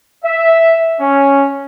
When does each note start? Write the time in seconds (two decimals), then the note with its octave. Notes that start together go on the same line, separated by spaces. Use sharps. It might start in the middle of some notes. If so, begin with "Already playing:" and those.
0.24 E5
1.00 C#4